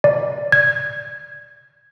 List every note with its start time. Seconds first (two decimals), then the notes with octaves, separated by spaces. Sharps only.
0.04 D5
0.52 G#6